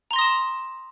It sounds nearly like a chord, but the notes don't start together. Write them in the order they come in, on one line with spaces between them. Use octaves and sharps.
A#5 C6 A#6 D#6 E7